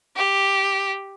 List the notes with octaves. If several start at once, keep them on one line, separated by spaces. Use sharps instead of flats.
G4